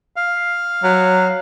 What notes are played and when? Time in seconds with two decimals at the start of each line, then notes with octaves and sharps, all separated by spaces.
0.16 F5
0.84 F#3